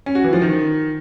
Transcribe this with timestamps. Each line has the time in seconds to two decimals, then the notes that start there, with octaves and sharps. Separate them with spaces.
0.06 C#4
0.15 F#4
0.24 E3
0.33 F3
0.42 D#3